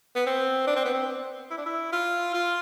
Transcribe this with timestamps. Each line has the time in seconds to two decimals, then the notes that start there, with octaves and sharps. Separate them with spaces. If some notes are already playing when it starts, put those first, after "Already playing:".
0.15 B3
0.26 C4
0.67 D4
0.76 C4
0.85 B3
0.94 C4
1.50 E4
1.57 D4
1.66 E4
1.92 F4
2.34 F4